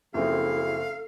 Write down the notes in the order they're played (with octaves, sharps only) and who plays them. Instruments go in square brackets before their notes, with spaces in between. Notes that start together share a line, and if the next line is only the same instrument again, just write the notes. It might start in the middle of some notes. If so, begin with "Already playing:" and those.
[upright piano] F#1 F3 C4 [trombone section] F#2 E4 G#4 [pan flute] A4 [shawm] F5